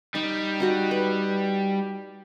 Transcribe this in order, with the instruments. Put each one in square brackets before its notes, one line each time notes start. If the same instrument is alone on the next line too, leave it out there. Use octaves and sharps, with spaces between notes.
[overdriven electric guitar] G3 [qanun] D#4
[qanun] D#4 F#4 D#5
B4